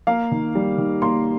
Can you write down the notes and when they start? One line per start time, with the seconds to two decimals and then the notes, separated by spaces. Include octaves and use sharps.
0.07 A#3 F5
0.32 D#3
0.55 G3
0.78 D#3
1.02 A#3 C6